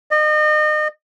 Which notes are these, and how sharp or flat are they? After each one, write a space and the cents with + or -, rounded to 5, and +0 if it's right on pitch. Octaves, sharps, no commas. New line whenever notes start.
D#5 -35